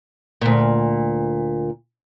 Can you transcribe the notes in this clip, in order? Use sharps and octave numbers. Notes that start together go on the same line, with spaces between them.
D2 A#2